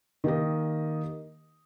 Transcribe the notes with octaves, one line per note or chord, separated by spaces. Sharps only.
D#3 A#3 G4 D#5